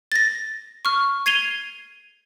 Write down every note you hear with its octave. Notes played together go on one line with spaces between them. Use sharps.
A6 A#6
C#6 F6
G#6 C7 D#7 F7 G7